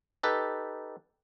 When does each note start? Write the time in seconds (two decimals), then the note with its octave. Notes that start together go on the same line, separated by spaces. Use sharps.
0.23 D#4 G4 A4 B4